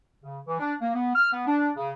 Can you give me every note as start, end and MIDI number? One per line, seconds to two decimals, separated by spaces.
0.23 0.39 49
0.47 0.58 52
0.60 0.74 62
0.82 0.93 58
0.95 1.11 59
1.16 1.29 89
1.33 1.47 59
1.47 1.71 62
1.77 1.92 49